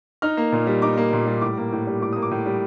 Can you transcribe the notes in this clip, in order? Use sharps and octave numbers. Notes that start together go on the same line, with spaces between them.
D#4 F6
A#3
A#2
G3
D#4 D6
A#3
A#2
G3
A2 D6
A#3
A2
G3
A2 D6
A#3 D#6
D6
A2
G3